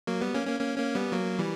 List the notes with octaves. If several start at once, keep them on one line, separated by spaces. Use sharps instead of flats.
F#3 A#3
G3 B3
A#3 C#4
A#3 C#4
A#3 C#4
A#3 C#4
G3 B3
F#3 A#3
E3 G3